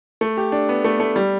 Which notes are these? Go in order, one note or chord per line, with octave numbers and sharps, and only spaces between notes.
A3
G4
D4
B3
A3
A3
G3